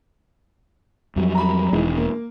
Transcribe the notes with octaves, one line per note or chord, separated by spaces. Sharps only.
F2 F#3 G3
A#5 B5
E1 D#3 E3 G#3
A#3